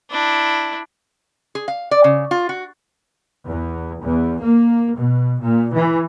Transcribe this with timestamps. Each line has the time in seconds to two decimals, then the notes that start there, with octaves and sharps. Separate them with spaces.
0.11 D4 E4
1.55 G#4
1.68 F5
1.91 D5
2.04 C#3
2.31 F4
2.49 F#4
3.45 E2
4.02 E2
4.40 A#3
4.95 B2
5.41 A#2
5.73 E3